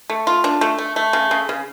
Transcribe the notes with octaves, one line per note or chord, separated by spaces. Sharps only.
A3
F4
D4
A3
A3
A3
C#3
C#3
C#3